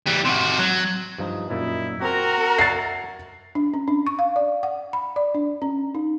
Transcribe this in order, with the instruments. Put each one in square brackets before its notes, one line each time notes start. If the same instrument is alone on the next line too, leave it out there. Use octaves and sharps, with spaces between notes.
[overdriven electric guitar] E3 G3
C3 F#4
F#3
[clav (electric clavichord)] G2 F3 D#4
[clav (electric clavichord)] F#2 A#2 D#4 [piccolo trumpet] E4
[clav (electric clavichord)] C4 [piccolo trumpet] F#4 [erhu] A#4
[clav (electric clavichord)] E5 F#5 [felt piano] A6 C7
[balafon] D4
C#4
D4
C#6
F5
D5
F#5
B5
D5
D4
C#4
D#4